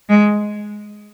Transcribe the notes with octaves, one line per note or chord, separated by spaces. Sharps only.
G#3